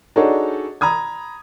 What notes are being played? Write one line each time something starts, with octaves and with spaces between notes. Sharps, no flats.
D4 D#4 F#4 G#4 A4 C#5
A#5 B5 D#6 G#6